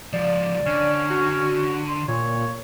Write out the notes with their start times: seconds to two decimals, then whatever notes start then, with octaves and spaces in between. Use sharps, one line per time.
0.13 C#2 F3 D5
0.66 D3 C#4
1.10 F#4
1.89 C6
2.08 A#2 C#5